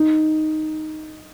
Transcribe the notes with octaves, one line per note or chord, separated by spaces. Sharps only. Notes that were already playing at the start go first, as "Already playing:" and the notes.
Already playing: D#4